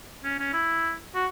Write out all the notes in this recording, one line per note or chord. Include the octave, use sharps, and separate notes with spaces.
C#4
C#4
E4
F#4